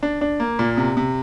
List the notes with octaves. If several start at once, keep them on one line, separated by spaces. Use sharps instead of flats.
D4
D4
A#3
A#2
C3
C3